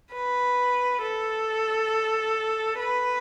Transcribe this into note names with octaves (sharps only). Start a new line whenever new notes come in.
B4
A4
B4